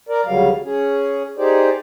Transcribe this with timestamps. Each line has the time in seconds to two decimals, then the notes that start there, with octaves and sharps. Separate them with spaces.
0.09 A#4 D5
0.26 D2 C#3 F#3 G3 F5
0.64 C#4 G#4
1.38 D#4 G4 G#4 C5 D5